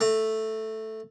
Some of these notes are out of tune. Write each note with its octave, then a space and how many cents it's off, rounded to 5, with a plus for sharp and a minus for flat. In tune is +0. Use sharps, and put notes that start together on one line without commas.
A3 +0 A#5 -40